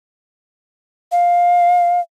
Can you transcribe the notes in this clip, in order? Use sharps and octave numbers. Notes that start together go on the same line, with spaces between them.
F5